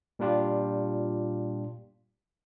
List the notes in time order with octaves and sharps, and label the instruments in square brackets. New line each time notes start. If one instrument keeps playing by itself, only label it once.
[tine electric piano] A#2 G3 D4 F4 G4